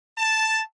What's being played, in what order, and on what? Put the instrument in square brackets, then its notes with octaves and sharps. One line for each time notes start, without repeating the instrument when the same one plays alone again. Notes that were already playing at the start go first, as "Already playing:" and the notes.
[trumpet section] A5